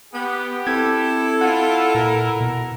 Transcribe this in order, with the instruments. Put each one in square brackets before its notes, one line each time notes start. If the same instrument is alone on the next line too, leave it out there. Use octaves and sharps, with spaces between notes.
[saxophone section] B3 [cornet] G4
[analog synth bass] C4 [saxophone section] E4 A4 [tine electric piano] G#6
[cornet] F4 [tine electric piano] F#5
[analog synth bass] A#2 [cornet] A#4
[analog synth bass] B2